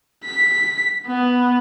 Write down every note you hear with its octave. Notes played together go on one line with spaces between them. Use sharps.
B6
B3